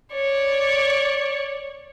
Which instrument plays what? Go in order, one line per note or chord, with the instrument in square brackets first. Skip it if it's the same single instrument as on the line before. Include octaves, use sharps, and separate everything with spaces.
[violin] C#5 D5